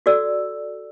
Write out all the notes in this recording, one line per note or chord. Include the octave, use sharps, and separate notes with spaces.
F#4 A4 D5 E6